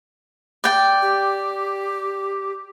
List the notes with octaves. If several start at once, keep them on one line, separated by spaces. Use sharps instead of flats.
D5 G5
G4